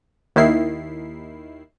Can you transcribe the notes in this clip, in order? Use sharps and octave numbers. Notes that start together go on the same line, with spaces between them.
D#2 D#3 E4 C7